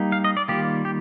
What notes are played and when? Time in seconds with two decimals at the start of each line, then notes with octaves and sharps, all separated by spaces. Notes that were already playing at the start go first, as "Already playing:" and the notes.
Already playing: G3 A#3 D#4
0.12 F5
0.24 D#5
0.37 D5
0.48 D#3 G3 A#3 F4 G4
0.85 G4